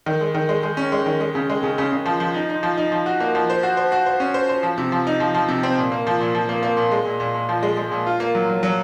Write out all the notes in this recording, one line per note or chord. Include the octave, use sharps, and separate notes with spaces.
D#3
G#3
D#3
G#3
G#3
C#4
G#3
D#3
G#3
C#3
G#3
C#3
C#3
C#3
F3
F3
D#4
D#4
F3
D#4
F3
F#4
A#3
F3
C5
F#4
C5
F#4
C5
C#4
C5
C5
F3
C3
F3
D#4
F3
F3
C3
C4
A#2
A#3
F3
A#2
F3
A#3
A#3
A#2
G#3
A#2
A#2
A#2
F3
G#3
G#3
A#2
F4
A#3
F#3
F#3
F#3